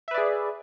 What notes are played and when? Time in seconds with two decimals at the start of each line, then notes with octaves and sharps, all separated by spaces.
0.08 E5
0.11 B4
0.14 D5
0.18 G#4